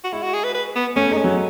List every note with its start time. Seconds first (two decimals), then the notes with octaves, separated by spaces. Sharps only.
0.04 F#4
0.12 G#3 E4
0.23 F#4
0.34 G#4
0.44 B4
0.54 B4
0.75 B3
0.96 A3 C#4
1.10 G#3 D#4
1.17 C#4
1.24 F#3